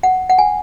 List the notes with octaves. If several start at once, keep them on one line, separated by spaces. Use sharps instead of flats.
F#5
F#5
G#5